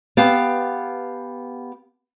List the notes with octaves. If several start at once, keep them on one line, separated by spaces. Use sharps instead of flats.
B3 G4 F5 A5